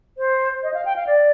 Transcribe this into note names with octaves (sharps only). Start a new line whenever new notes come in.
C5
D#5
F5
G5
F5
D5